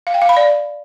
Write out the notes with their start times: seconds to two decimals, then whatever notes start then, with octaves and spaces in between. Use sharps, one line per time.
0.07 F5
0.14 G5
0.22 F5
0.29 B5
0.37 D5